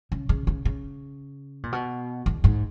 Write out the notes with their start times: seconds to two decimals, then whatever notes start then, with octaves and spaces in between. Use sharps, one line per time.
0.12 C#3
0.29 C#3
0.47 C#3
0.65 C#3
1.63 A#2
1.72 B2
2.26 E2
2.44 G#2